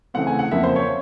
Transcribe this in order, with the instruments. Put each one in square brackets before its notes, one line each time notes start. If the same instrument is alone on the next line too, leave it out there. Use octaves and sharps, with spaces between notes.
[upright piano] C#3 E3 A3 C4 F#5
G#5
F#5
F2 C#3 F3 A#3 E5
C5
C#5